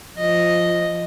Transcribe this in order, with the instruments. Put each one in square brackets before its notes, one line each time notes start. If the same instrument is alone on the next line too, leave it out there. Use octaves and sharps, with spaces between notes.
[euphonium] F3 [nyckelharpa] D#5